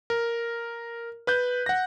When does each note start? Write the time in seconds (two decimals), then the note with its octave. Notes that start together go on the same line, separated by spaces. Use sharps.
0.10 A#4
1.27 B4 F#6 G6
1.66 F#5 A#6